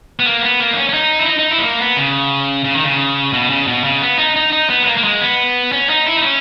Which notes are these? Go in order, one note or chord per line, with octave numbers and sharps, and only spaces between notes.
B3
A#3
B3
A#3
D#4
C#4
C#4
D#4
E4
D#4
D#4
E4
G#3
A#3
B3
C#3
C#3
D#3
C#3
B2
C#3
B2
C#3
B3
D#4
D#4
D#4
B3
G#3
A#3
A#3
G#3
B3
C#4
D#4
E4
D#4
C#4